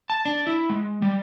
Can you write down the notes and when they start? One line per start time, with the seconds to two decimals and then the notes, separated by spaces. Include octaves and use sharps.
0.10 A5
0.25 D4
0.47 E4
0.69 G#3
1.02 G3